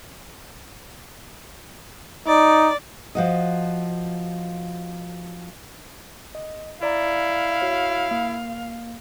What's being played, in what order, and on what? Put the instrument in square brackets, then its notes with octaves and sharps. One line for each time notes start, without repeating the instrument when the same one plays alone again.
[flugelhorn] D#4 [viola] D5
[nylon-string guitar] F3 F#4 D#5
[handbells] D#5
[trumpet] E4 [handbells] D5 A#5 [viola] F5
[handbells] F#4 C#5
A#3